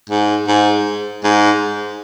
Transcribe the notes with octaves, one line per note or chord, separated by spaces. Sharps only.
G#2
G#2
G#2